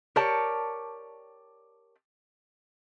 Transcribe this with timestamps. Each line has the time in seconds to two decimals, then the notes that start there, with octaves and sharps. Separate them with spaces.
0.16 G4 A#4 C#5 D5 A5